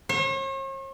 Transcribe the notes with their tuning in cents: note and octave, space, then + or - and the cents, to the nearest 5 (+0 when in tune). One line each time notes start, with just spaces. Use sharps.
C#5 -45